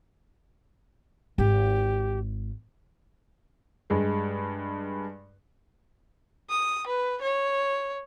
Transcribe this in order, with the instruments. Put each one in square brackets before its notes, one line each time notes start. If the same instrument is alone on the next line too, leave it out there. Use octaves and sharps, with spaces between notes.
[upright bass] G#1 [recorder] G4
[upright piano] G2 G#3
[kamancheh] D#6
B4
C#5